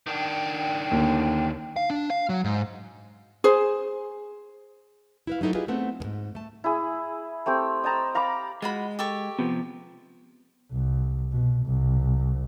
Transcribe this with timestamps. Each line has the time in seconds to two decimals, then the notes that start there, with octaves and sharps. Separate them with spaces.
0.07 D#3 D4 G5
0.91 D#2 D3
1.76 F5
1.90 D4
2.10 F5
2.29 F#3
2.44 G#2
3.44 G#4 C5
5.27 E4 B4 F5
5.41 F#3 A3 D#4 E4 A4
5.54 E4 F4 G4 G#4 B4 D#5
5.68 A3 B3 C4 F#5
6.00 E2 G#2
6.35 A3 A5
6.64 E4 G#4
7.46 A3 C4 G4 G5
7.84 D#5 G5 A5 A#5
8.15 F5 A#5 B5 D6
8.62 G#3 F4 F#4 B5
8.99 G4 A4 C#6
9.39 C3 F3 B3
10.72 C2
11.32 B2
11.66 C2